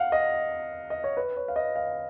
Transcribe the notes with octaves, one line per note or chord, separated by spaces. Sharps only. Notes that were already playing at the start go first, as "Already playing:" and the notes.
Already playing: F5 F#5
D#5
D#5
C#5
B4
C#5
F5
D#5
F5